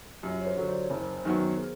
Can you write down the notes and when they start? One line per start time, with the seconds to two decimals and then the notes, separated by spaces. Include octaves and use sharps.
0.23 F#2 F4 G4
0.41 C#5
0.46 A#4 C5
0.57 D3 F#3
0.68 C5 D5
0.83 C#5
0.90 F#1 A#4 C5
1.24 F#2 D#3 F#3 B3
1.57 G#4 A#4